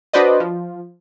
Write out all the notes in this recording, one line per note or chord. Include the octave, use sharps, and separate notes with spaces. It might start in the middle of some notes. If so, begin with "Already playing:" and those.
D4 F#4 B4 C5 D5 D#5
F3